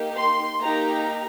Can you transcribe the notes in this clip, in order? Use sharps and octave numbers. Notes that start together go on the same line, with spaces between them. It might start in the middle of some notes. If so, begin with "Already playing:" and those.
Already playing: A#3 D#4 G4
C6
A#3 D#4 G4 A#5